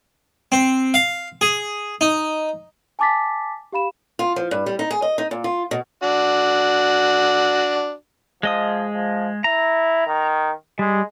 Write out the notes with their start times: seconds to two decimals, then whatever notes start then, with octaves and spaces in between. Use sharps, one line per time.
0.52 C4
0.94 F5
1.41 G#4
2.01 D#4
2.99 G#5 A5 D6 A6 B6
3.73 G4 F5 B5 E7
4.19 F4
4.36 F3
4.51 G2
4.66 G3
4.79 D#4
4.91 G#4
5.02 D#5
5.18 D#4
5.31 A#2
5.44 F4
5.71 B2
6.03 D4 F#4
8.43 F3 G#3 D#5 D#6
8.95 F3
9.44 E4 A#5
10.07 D#3
10.79 G3 G#3